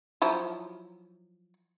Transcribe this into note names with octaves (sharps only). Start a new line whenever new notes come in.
F3 F#3 E4